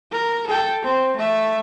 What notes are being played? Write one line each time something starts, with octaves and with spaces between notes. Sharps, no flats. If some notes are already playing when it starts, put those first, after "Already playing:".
A#4
A4 G5
C4
A3 E5